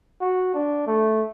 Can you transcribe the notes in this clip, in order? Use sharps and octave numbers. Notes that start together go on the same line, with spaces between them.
F#4
D4
A3